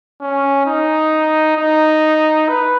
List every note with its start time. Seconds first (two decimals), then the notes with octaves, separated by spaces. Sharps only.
0.21 C#4
0.66 D#4
1.57 D#4
2.49 B4